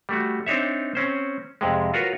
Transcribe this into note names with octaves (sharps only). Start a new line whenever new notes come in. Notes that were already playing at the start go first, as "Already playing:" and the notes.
G3 A3 F#4
C4 D4 D#4 C#5 E5
C4 C#4 C5
F2 C3 G#3
F4 F#4 A#4 B4 C#5